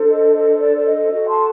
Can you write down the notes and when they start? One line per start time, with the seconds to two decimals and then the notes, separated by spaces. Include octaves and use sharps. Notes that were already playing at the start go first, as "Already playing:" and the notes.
Already playing: D4 A4 C5
0.09 D#5
0.34 D#5
0.59 D5
0.77 D5
0.85 D#5
1.11 F#4 A4 C5 D#5
1.28 A5 C6